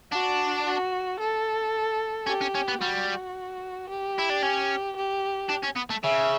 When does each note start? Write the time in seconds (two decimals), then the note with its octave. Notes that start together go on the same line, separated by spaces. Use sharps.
0.12 D4 F#4
0.66 F#4
1.19 A4
2.27 C#4 G4
2.41 C#4
2.55 C#4
2.68 B3
2.81 G3 F#4
3.89 G4
4.19 E4
4.30 D4
4.43 C#4
4.96 G4
5.49 D4
5.64 C#4
5.76 B3
5.90 A3
6.03 C#3 E5